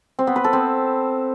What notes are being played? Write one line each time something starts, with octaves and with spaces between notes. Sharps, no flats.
C4
B3
B4
A4
C4